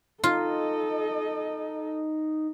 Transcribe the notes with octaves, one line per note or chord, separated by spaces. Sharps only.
D#4 F4 A4 D#5